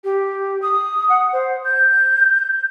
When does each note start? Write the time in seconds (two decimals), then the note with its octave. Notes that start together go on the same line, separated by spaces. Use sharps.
0.04 G4
0.62 D#6
1.09 F#5
1.33 C5
1.65 G6